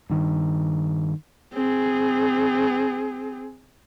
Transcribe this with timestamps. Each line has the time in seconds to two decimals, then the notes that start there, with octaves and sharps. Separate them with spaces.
0.10 G2 D#3
1.54 C4 G#4